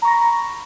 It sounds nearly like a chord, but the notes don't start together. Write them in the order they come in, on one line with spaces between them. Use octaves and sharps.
A#5 C#6 A#6 B5